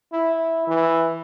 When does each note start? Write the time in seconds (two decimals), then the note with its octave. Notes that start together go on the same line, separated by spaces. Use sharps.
0.13 E4
0.67 E3